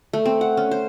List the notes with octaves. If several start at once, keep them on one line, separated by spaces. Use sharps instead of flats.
A3
C4
F#5
C#4
C5